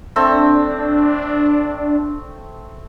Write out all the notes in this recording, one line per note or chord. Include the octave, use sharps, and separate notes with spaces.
A3 C4 D4